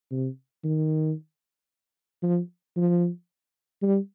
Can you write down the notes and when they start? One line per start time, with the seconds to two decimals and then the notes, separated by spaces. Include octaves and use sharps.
0.11 C3
0.64 D#3
2.23 F3
2.76 F3
3.82 G3